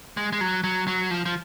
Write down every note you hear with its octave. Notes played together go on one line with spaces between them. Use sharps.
G#3
G#3
F#3
F#3
F#3
F3
F3